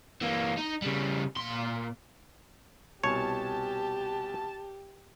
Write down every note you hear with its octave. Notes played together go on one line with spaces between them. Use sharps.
E3 A#3
D#4
C#3 G3
A#2 C6
C2 B2 G4 C#5 G#5 A5